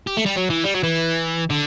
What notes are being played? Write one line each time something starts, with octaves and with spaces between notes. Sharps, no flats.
G4
A3
G3
F#3
E3
G3
F#3
E3
D3